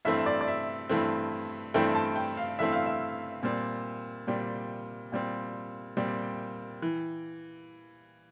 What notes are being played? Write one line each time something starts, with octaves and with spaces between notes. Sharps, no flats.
G2 E3 A3 C4 E5
E5
D5
D5
E5
G2 E3 A3 C4
G2 E3 A3 C4 G5
A5
G5
F5
G2 E3 A3 C4 E5
F5
E5
A#2 G3 C4
A#2 G3 C4 G5
A#2 G3 C4
A#2 G3 C4 G5
E3